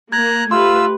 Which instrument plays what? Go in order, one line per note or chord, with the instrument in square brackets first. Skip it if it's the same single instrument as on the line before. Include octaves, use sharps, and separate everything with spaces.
[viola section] A#3 [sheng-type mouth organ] A#5 F#6 [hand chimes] G#6
[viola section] A3 G4 B4 [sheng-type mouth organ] F4 E6 [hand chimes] C6